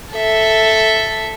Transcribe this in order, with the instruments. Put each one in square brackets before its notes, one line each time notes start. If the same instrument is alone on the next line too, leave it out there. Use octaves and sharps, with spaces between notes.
[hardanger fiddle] A4 E5